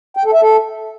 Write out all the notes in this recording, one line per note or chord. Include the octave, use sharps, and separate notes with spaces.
G5
A4
E5
A4